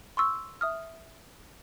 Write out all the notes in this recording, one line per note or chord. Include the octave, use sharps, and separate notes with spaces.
C6 C#6 E6
E5 D#6 F6